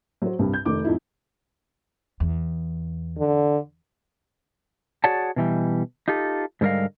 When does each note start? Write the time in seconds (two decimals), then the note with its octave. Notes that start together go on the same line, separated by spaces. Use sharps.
0.22 F#3 C5
0.39 C2 G2
0.53 G6
0.65 F1 D#3 D6
0.84 F2 D#4 E4
2.20 E2
3.19 D3
5.04 F#4 G#4 C#5 D5 F#5 A5
5.36 B2 E3 G3
6.08 D#4 F4 G4 A4
6.61 G#2 D3 G3 A#4 D#5 F5